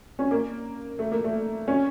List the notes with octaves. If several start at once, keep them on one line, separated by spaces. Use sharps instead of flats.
C#4
A#3
A3
A#3
A3
C#4